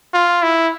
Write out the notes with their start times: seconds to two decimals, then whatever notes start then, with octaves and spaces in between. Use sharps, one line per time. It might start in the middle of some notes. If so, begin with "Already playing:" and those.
0.14 F4
0.43 E4